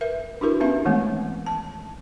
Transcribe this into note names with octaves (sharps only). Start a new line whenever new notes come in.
A#4 B4 E5
D4 E4 F#4 G4 A#4 B4
B3 C#4 D#4 B4 E5 F5
D#3 E3 G#3 A3 B3 C4
A5